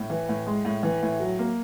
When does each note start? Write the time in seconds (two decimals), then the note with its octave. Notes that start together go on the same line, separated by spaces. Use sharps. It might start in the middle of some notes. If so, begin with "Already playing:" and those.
Already playing: A2
0.10 E3
0.29 A2
0.47 G#3
0.65 A2
0.83 E3
1.03 A2
1.20 F#3
1.39 A#3